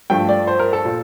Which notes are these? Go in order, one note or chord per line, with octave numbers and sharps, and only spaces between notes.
G2 F3 A3 G5
D5
C5
A#4
A4
A#2